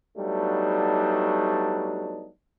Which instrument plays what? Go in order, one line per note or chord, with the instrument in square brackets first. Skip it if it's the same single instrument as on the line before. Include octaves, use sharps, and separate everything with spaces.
[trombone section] F#3 G3 A3 B3 D4 D#4